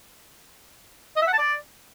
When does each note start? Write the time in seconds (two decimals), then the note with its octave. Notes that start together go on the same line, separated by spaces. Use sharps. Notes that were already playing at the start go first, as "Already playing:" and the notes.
1.16 D#5
1.22 E5
1.27 F#5
1.33 A5
1.38 D5